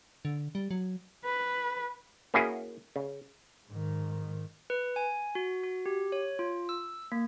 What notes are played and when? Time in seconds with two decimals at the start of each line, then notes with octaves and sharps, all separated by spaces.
0.25 D3
0.55 G3
0.71 F#3
1.24 B4
2.34 A#3 C#4 E4 F#4 G#4
2.96 C#3
3.68 G#2 D#3
4.70 B4
4.96 G#5
5.35 F#4
5.63 F#4
5.86 G4
6.12 C#5
6.39 F4
6.69 E6
7.12 A#3